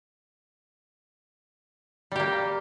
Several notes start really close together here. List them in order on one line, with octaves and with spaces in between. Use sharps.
G3 G4 A#3